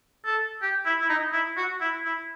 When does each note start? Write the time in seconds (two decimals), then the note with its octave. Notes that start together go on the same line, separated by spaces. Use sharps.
0.26 A4
0.62 G4
0.86 E4
1.01 E4
1.09 D#4
1.33 E4
1.57 F#4
1.81 E4
2.05 E4